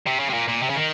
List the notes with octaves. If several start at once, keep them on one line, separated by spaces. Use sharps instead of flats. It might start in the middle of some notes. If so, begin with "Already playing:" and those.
C3
C#3
C3
A#2
A#2
C3
C#3
D#3